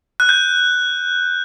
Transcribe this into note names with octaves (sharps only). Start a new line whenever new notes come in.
F#6
G6